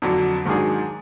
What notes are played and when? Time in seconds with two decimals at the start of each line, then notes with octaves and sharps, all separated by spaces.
0.02 F2 D3 F#3 D4
0.45 G#2 D#3 F#3 D4 G#4